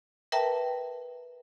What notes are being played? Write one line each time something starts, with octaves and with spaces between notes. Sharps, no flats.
A#4 B4 E5 G5 A5 A#5